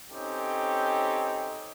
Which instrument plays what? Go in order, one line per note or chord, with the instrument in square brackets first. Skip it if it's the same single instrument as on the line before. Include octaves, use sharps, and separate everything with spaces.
[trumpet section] C4 C#4 D#4 G4 A4